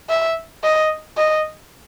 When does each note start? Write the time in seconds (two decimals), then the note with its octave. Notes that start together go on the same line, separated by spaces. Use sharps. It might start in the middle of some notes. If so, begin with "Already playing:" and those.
0.09 E5
0.63 D#5
1.17 D#5